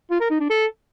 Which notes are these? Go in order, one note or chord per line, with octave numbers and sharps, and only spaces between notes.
F4
A#4
D#4
D4
A4